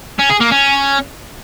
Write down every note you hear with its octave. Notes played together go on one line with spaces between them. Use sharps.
C#4
G#4
A#3
C#4